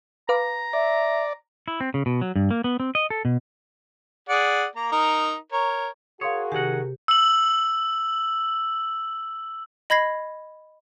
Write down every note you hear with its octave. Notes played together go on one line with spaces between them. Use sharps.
B4 F5 A#5 D6
D5 E5
E4
C4
C#3
B2
F#3
G2
A#3
B3
C4
D#5
A4
B2
G#4 D5 F#5
A#3 A#5
D#4 A#4
A#4 C#5
F#4 G#4 A#4 C#5 F5 C6 D#6
C3 D#3 G4 F#5 G#5 G#6 A#6
E6 F#7
D#5 B5 G#6 A#6 C7